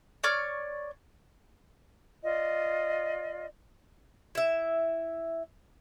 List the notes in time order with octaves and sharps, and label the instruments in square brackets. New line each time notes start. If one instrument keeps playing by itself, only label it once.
[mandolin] C#5 D5 C#6 F6
[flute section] F4 D5 D#5
[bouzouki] E4 E5